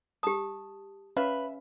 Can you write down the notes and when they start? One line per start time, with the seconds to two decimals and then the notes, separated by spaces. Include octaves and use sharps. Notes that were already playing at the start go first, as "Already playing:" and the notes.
0.23 G4 A5 D#6
1.17 C#4 B4 E5 F5 B5